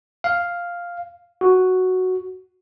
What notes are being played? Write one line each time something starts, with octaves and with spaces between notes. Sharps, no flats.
F5
F#4